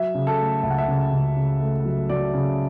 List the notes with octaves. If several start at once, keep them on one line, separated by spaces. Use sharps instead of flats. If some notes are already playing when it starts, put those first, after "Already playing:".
Already playing: F#3 E5
C#3
A4
A3
C#2 E5
F#5
E5
C#3
C#2
C#3
A3
F#3
F#3 D5
C#3